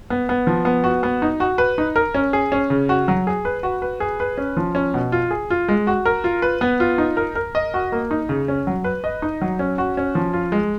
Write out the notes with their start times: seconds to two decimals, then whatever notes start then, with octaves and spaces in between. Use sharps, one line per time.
0.10 B3
0.29 B3
0.47 F3
0.65 B3
0.84 F#4
1.03 B3
1.22 D#4
1.40 F#4
1.58 B4
1.78 D#4
1.96 A#4
2.14 C#4
2.33 G#4
2.52 C#4
2.70 C#3
2.89 F#4
3.08 F#3
3.27 G#4
3.45 B4
3.63 F#4
3.82 B4
4.00 G#4
4.20 B4
4.38 C#4
4.57 F3
4.75 C#4
4.94 B2
5.12 F4
5.31 G#4
5.50 F4
5.68 G#3
5.87 F#4
6.05 A#4
6.24 F4
6.42 B4
6.61 B3
6.80 F4
6.98 D#4
7.17 A#4
7.35 A#4
7.55 D#5
7.74 F#4
7.92 A#3
8.11 D#4
8.29 C#3
8.48 C#4
8.67 F#3
8.84 B4
9.04 D#5
9.22 D#4
9.41 F#3
9.59 C#4
9.78 F#4
9.97 C#4
10.15 F3
10.33 F4
10.52 G#3